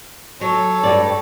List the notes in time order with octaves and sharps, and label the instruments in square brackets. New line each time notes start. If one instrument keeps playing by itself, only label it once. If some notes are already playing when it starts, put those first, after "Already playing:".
[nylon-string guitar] F#3 [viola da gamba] A4 C#5
[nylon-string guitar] G2 G3 D5